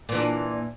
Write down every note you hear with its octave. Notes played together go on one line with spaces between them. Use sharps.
A#2 E3 D4